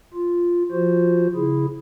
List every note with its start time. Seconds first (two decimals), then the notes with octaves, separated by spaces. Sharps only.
0.14 F4
0.71 F3 F4 F#4 C5
1.35 C#3 E4 G#4